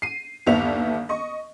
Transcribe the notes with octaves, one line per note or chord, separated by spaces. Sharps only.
C7 D#7
G1 D#2 B3 D5 E5 F7
D#5 C#6